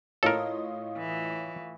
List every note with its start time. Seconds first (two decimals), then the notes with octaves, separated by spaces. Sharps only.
0.23 A2 F4 A4 A#4 C#5 D#5
0.98 E3